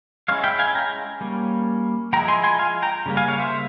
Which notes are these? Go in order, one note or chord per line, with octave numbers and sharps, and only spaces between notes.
G#3 C#4 E4 C#5 F5
E5 G5
F5 G#5
G5 A#5
G3 A#3 C#4
F3 G#3 E4 G5 A#5
G#5 C6
G#5 C6
F5 G#5
G5 A#5
C#3 G3 A#3
F5 G#5
C#5 F5
C5 E5